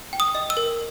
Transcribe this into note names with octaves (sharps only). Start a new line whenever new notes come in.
G5
D#6
D#5
E6
A#4